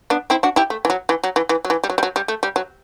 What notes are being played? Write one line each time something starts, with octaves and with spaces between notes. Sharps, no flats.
B3 D4
C4 E4
D4 F#4
E4 G4
A3
E3
F#3
E3
F#3
E3
E3
F#3
E3
G3
F#3
G3
F#3
G3
A3
G3
F#3